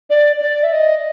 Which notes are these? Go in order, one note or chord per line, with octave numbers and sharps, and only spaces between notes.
D5
D5
E5
D#5